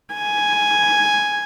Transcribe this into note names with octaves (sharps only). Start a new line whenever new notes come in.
G#5